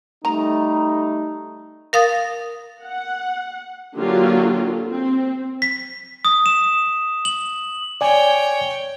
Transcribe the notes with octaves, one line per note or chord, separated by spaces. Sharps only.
G3 A3 D#4 A#5
A#4 F5 D#6 A6
F#5
D3 F#3 A#3 F4 G4
C4
B6
D#6
E7
F#7
C#5 D5 G5 G#5